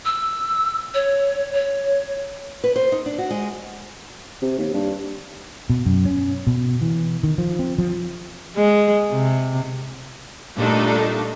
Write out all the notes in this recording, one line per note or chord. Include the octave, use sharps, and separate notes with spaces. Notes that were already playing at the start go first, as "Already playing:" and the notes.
E6
C#5
C#5
B4
C5
D#4
D4
F#4
G#3
C3
D#2
G2
B2
F#2
C#4
B2
E3
D#3
F3
C4
F3
G#3
C3
A#2 G3 A3 D4 D#4 A4